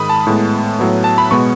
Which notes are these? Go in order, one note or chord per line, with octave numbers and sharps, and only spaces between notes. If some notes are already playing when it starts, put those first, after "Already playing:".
Already playing: G#2 D#3 G#3 B5 D#6
A5
A2 G#3 B3
A2 F#3 B3
A5
B5
B2 G#3 B3 C#6